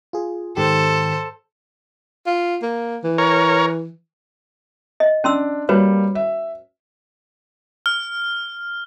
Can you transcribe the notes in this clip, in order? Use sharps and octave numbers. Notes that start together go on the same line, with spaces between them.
F4 G#4
G#2 D#3 G4 A4 C5
F4
A#3
E3
A#4 C#5
D#5
C#4 D4 C6 E6
G3 A#3 F#4 B4 C#5
E5
F6